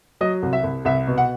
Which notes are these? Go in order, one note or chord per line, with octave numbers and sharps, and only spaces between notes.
F#3 D#5
C2
E5
C2
C2 E5
B2
F#5